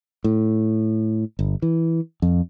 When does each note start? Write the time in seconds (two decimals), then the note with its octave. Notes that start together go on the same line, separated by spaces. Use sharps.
0.24 A2
1.39 G1
1.62 E3
2.22 F2